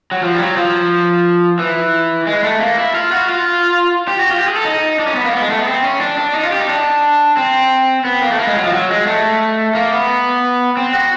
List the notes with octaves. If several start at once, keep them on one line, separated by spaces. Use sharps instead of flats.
F#3
F3
G3
F#3
F3
E3
G#3
A3
A#3
E4
F4
F#4
F4
G4
F#4
F4
G4
G#4
A4
D#4
D4
C#4
B3
A#3
B3
G#3
A3
B3
C4
C#4
D4
D4
D#4
F4
G4
D#4
D4
C4
B3
A#3
A3
A#3
G#3
F#3
F3
F#3
G#3
A3
A#3
B3
C4
F#4